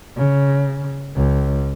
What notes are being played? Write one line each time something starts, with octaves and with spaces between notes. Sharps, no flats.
C#3
C#2